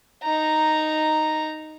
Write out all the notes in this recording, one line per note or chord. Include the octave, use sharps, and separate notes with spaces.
D#4 A#5